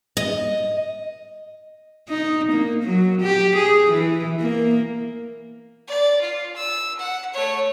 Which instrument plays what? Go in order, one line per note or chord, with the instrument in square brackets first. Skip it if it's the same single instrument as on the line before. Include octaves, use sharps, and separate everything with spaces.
[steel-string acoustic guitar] D#5
[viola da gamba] D#4
A#3
F#3
G4
G#4
E3
A#3
[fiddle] D5
F4
E6
F#5
A3 C#5